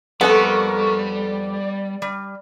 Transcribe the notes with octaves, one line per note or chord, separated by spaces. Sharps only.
F2 G3 B3 A4 A#4 A5 C#6
D5
G3